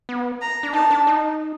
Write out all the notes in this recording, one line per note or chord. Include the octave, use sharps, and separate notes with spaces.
B3
A#5
D4
D#4 A5
D4
D#4